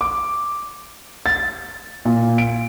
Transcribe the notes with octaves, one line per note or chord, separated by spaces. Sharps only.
D6
A6
A#2
D7